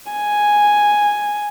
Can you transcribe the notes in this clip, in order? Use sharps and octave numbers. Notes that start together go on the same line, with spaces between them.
G#5